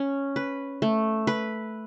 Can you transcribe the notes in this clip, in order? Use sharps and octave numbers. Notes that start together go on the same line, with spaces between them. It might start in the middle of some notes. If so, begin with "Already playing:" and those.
Already playing: C#4
B4
A3
B4